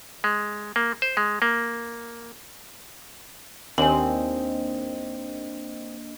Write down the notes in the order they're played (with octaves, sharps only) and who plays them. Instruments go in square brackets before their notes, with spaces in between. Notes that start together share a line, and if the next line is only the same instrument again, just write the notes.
[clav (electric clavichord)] G#3
A#3
C5
G#3
A#3
[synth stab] D#2 [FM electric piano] A#3 D4 D#5 [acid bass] C4 [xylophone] G#5 F#7